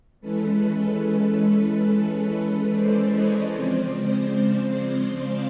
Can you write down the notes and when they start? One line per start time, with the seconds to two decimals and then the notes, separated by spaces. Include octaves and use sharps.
0.21 E3 G#3 C#4 A4 B4
2.70 C5 D5
3.11 C#5 D#5
3.53 C#3 F3 G#3 C4 C5 D5
5.19 F5